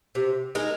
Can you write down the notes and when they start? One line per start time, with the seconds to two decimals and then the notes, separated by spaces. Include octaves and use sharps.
0.15 C3
0.55 G#3 D#4 A#4